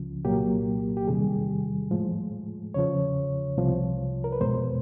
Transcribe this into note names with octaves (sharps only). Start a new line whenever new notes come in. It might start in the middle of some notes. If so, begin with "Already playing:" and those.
Already playing: C#2 C#3 F3
C2 A#2 F#3 A#3 G4
G4
E2 C3 D#3 G3 G#4
A2 F3 G#3
E2 C#3 F3 C#5
C2 C3 F3
A#4
B4
E2 B2 G#3 C5